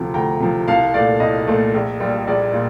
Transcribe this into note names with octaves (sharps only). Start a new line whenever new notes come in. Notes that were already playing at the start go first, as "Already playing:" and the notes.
Already playing: D2 C3 F3
D2 G5 A#5
C3 F3
C2 F5 A5
A#2 A3 D5 F5
C2 D#5
A#2 A3
A#1
A#2 G3
A#1 D5
A#2